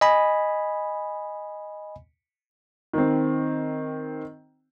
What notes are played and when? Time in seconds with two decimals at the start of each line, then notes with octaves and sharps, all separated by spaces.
0.01 D#5 G#5 B5
2.93 D#3 C4